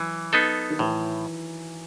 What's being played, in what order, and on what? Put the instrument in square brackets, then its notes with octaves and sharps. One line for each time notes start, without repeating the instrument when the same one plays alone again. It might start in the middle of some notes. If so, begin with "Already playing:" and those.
Already playing: [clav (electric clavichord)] E3 [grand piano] F#3
[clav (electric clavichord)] B3 D#4 A4
[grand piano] D#3
[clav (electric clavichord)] A2 [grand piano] E3